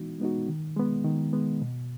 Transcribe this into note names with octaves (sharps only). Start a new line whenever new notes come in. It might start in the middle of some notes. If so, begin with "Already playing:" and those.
Already playing: E3 G#3 B3 D#4 F#4
G#3 B3 D#4 F#4
D#3
G#3 B3
D#3
G#3 B3
B2